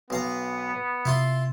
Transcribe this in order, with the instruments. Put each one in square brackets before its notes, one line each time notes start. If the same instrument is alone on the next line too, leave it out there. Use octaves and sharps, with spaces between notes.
[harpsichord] B1 F5 A#5 [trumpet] B3
[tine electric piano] C3 [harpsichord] E4 F4 C6